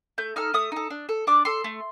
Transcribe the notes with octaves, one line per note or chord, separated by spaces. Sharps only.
A3 G6
D#4 A4 F6
A3 D#6
D#4 A4
D4
A4
D4 D6
A4 C6
A3